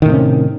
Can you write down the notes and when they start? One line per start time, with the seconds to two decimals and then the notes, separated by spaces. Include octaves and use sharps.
0.02 D#3
0.06 A2
0.09 C3
0.13 C#4